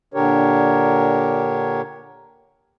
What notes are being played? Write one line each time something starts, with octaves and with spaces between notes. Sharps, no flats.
A#2 D3 D4 G4 A#4 C#5